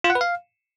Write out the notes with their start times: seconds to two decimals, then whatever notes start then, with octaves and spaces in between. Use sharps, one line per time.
0.04 F4
0.10 F#5
0.15 B4
0.21 F5